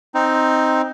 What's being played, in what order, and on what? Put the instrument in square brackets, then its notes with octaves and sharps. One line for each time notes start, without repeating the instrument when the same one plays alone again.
[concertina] C4 D#4